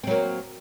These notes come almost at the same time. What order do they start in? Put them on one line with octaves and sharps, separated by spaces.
C4 F#3 A#3